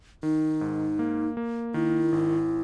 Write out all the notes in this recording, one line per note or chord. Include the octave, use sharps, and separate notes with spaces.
D#3 D#4
G#2
A#3
A#3
D#3 E4
G#1